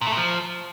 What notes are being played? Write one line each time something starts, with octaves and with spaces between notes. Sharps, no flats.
A#2
A3
A#2
F3